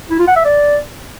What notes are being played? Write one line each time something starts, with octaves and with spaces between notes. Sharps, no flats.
E4
F4
F#5
E5
D5